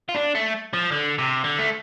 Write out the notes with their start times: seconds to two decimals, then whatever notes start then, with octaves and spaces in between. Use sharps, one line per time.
0.09 F4
0.15 D4
0.35 A3
0.73 F3
0.92 D3
1.18 C3
1.44 D3
1.59 A3